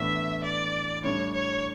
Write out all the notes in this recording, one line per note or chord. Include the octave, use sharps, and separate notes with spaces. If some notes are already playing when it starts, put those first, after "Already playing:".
Already playing: A2 E3 B3 D4 E5
D5
A2 G3 D4 C#5
C#5